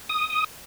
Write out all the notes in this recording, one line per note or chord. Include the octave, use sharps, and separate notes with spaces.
D#6